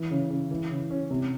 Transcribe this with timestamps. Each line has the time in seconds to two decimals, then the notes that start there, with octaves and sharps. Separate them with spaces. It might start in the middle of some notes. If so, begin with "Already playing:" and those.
Already playing: E3
0.11 C#3
0.30 C#3
0.51 E3
0.70 C#3
0.90 C#4
1.10 C3